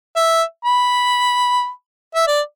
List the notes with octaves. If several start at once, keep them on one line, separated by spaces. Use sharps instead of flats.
E5
B5
E5
D5